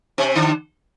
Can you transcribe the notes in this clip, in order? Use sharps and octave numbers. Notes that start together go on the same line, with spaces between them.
C3 C4
D3 D4